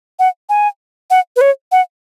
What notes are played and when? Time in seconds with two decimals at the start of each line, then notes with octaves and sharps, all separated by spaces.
0.19 F#5
0.49 G#5
1.10 F#5
1.36 B4
1.41 C#5
1.72 F#5